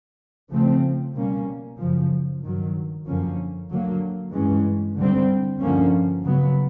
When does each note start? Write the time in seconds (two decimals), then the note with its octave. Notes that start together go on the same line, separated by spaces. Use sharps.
0.51 C#3 F3 A3 C4
1.15 B2 G3 A#3 C#4
1.78 F#2 C#3 F3
2.42 G2 D#3 F#3
3.07 F#2 D3 F3 A#3 C#4
3.70 D3 F#3 A#3
4.33 G2 E3 G#3 C#4
4.97 D3 G3 C4
5.61 G2 D3 F3 A#3 C#4
6.25 C#3 F#3 B3